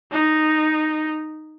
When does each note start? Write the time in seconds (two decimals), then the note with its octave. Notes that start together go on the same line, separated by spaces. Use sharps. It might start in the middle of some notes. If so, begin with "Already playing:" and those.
0.12 D#4